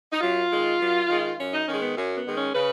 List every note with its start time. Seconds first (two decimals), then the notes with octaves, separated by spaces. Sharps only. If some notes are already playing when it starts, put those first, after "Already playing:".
0.11 D#4
0.21 F#2 F4
0.50 D#3 G#3
0.80 F#2
1.09 D#3 G#3
1.38 F#2 C#4
1.53 D#4
1.67 D#3 G#3 C#4
1.82 B3
1.97 F#2 C#4
2.16 B3
2.26 D#3 G#3
2.36 C#4
2.55 C#3 B4